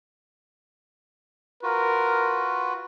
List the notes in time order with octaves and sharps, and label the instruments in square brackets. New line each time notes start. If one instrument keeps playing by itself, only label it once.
[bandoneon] F4 F#4 B4 [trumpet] A#4